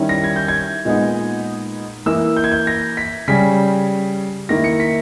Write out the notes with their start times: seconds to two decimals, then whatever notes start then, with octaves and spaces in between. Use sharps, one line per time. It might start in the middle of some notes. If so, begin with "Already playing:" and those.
Already playing: D#3 G3 C#4 E4
0.09 A#6
0.24 G#6
0.36 G6
0.48 G#6
0.85 A#2 G#3 B3 D#4
2.06 E3 A#3 E4 E6
2.36 G6
2.44 G#6
2.52 G6
2.67 A#6
2.97 B6
3.28 C#3 G3 C#4 B6
4.49 D#3 A#3 E4 A#6
4.64 C#7
4.80 B6